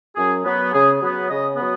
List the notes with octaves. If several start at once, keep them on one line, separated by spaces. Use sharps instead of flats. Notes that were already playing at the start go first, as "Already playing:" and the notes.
F#2 G#4
F#3 B3
C#3 G#4
F#3 B3
C#3 D#5
F#3 B3